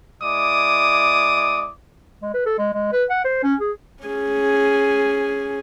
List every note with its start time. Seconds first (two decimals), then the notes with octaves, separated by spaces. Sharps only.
0.21 G#3 E4 D5 D6 D#6
2.22 G#3
2.34 B4
2.46 A4
2.58 G#3
2.73 G#3
2.92 B4
3.10 F#5
3.24 C5
3.43 C#4
3.60 G#4
4.04 C#4 G#4